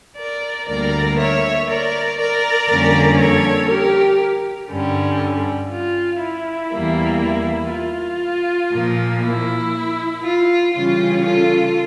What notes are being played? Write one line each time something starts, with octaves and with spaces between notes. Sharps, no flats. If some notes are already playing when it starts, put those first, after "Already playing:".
A#4 D5
D2 D3 G3 A#3 A#4 D5
C#5 E5
A#4 D5
A#4 D5
F2 D3 G3 A#3 C#4
A4 C#5
G4 A#4
G2 D3 G3 C#4
F4
E4
E2 E3 G3 A#3
E4
F4
A#2 F3 A#3
E4
F4
C#3 E3 G3 C#4 F4
F4 A4